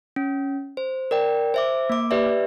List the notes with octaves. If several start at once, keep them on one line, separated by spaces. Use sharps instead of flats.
C#4
C5
A#4 D5 G5
C5 E5 D6
A#3 D6
G4 B4 D5 E5